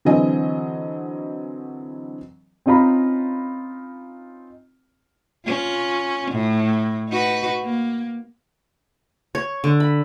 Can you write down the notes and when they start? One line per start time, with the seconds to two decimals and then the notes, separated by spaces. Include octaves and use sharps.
0.05 D3 E3 F#3 C4 D#5 G#5
2.66 C4 C#4 D#4 F4 A#5 B5
5.45 C#4 F4
6.31 A2
7.09 D#4 F#4 B4
7.64 A#3
9.35 C#5
9.64 D3
9.80 B5